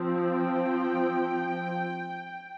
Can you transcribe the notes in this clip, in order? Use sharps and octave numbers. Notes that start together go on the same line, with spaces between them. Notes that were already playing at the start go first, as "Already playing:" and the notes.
Already playing: F3 C4
G5